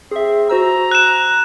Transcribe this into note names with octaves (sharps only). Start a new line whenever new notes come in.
C4 G#4 E5
F#4 C5 A#5 E6
F#6 E7